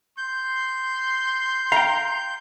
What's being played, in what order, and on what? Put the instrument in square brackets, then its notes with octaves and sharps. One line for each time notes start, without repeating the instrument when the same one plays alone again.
[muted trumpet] C6 [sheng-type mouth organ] G6
[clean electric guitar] F5 G5 [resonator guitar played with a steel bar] A#5